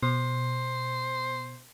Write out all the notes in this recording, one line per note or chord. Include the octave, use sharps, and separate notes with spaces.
B2 C5